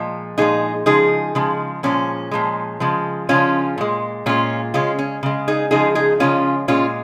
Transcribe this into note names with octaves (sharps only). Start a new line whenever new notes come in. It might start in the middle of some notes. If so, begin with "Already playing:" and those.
Already playing: A#2 F3 G#3
A#2 F3 G#3 D#4 G#4
C#3 F3 G#3 D#4 G#4
C#3 F3 G#3
A#2 F3 G#3 C#4
A#2 F3 G#3
C#3 F3 G#3
C#3 F3 G#3 C#4 F4
A#2 G#3
A#2 G#3 C#4 F4
C#3 G#3 C#4 F4
C#4
C#3 G#3
D#4 G#4
C#3 F3 G#3 D#4 G#4
D#4 G#4
C#3 F3 G#3 C#4 F4
A#2 G#3 C#4 F4